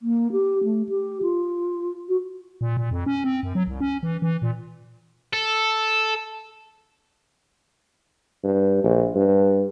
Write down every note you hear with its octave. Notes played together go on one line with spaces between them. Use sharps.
A#3
G4
A3
G4
F4
F#4
A#2
A#2
F2
C#4
C4
F#2
F#3
C2
C#4
E3
E3
A#2
A4
G2
A#1
G2